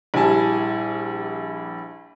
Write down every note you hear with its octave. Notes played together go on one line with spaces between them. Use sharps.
A#1 G3 E4 G#5 A5